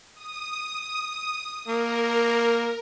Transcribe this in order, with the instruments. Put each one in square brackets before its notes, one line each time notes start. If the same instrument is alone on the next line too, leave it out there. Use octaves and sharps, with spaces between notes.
[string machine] D#6
[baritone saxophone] A#3 [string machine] A#4